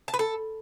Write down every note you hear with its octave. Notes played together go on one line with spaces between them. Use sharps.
A5
B4
A4